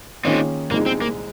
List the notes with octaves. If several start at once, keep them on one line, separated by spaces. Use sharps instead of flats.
D#3 A#3 C4 C#4 D#4 F4 G#4
C2 A#2 G#3 A#3 D#4
C4
A#3